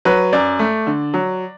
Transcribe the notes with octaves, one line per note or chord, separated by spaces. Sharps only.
F#3 B4
F#2 D5
A3
D3
F#3